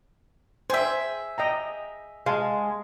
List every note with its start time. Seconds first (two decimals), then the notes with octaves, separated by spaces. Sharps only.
0.70 G#4 C5 E5 G5
1.38 D#5 G5 A#5
2.26 G#3 F5 A5